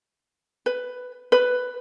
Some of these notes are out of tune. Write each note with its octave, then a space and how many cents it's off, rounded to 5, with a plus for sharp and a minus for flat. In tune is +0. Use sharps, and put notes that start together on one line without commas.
B4 +10
B4 +10